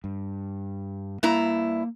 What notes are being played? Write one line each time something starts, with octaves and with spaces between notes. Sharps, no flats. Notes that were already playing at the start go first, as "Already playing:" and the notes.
G2
G2 A#3 E4 A#5